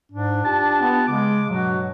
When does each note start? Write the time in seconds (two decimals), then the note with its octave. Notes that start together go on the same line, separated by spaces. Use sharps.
0.12 G#2 D4
0.44 F4 G4 A5
0.81 B3
1.07 C#3 G#3 D6
1.50 G2 B2 F#3 F#4